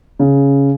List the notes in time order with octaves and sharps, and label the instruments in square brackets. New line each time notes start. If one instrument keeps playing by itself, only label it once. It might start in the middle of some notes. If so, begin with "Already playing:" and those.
[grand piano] C#3